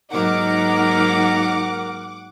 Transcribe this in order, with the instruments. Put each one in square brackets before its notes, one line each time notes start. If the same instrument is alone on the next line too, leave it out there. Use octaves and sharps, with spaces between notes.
[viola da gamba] G#2 F#3 A#3 [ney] D#4 [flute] A#4 [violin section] F#5 D6